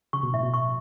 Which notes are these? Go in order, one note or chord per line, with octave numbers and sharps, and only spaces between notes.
C#3 C#6
B2
A2 E5
B2
C#6